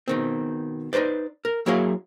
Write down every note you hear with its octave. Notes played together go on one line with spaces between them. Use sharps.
B2 D#3 C4
D#4 F#4 B4 C5 D5
A#4
F#3 A#3 E4 G#4 C#5 F5